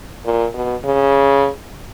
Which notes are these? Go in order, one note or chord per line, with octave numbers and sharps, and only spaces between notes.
A#2
B2
C#3